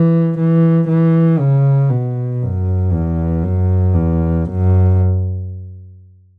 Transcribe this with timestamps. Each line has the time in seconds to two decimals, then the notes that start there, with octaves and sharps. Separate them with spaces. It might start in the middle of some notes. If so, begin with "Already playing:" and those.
Already playing: E3
0.38 E3
0.88 E3
1.39 C#3
1.90 B2
2.42 F#2
2.93 E2
3.44 F#2
3.94 E2
4.45 F#2